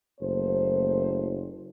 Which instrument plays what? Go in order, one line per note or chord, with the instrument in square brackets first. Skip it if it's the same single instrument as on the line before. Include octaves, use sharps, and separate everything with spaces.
[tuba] F#1 [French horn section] A3 A#3 C5